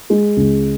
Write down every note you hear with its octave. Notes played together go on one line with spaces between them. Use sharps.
G#3
C#2